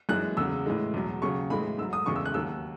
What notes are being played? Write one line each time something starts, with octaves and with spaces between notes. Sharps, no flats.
F#2 E3 G#3 F#6
E2 C#3 F#3 E6
A2 E3 G#3
E2 B2 F#3
D#2 C#3 F#3 C#6
A2 E3 G#3 B5
G#2 F#3 E6
D#6
E2 C#3 E3 G#3 C#6
E6
F#6
D#2 D#3 F#3 E6